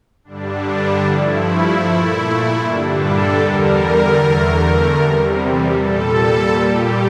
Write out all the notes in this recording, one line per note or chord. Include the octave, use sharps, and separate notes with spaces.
G2 D3 G3 D4
G2 F3 A3 E4
A#2 A3 E4
G2 D3 G3 D4
A4
E2 D3 G3 A#4
E2 D3 A3
E2 C3 G3
A#2 G3 A4
A#2 G3 G4